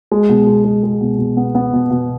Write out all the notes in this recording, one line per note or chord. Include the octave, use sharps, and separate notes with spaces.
G#3
B2
G#3
G#3
G#3
B2
B2
B3
B3
B2
B2